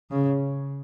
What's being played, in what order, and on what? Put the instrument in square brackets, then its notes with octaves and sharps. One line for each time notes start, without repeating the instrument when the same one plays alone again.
[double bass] C#3